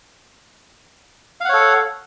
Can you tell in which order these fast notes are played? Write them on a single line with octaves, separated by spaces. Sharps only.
F5 F#5 C#5 A4